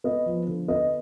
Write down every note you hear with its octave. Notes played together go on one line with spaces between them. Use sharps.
B3 D#5
F3
D3
B3 D#5